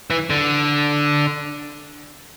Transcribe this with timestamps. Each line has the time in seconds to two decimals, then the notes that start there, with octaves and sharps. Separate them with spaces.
0.10 E3
0.30 D3